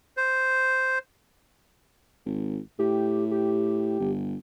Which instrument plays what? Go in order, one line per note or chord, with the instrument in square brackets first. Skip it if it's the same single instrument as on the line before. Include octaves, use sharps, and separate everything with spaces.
[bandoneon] C5
[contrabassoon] G#1
[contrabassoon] A2 [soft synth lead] G4
[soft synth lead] G4
[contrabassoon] G1